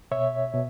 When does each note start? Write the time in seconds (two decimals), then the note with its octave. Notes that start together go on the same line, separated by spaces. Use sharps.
0.11 B2 C#5 E5
0.54 B2